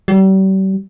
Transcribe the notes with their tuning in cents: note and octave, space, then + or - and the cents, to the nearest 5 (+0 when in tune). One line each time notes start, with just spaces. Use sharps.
G3 -40